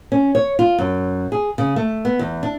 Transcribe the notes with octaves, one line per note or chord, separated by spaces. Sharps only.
C#4
C#5
F4
F#2
G#4
C#3
A3
B3
E2
D4